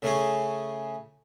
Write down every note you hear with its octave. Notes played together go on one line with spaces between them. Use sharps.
C#3 A3 C#4 G#4